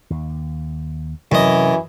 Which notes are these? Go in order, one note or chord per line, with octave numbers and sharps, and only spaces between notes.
D#2
F#2 C3 E3 F#3 C#4 D#5